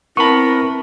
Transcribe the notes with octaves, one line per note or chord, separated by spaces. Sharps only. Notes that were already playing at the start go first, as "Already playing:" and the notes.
B3 C4 E4 A#4 A5 B5 C#6